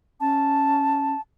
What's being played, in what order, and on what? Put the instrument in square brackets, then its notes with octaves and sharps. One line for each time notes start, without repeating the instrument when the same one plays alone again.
[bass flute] C#4 [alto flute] A5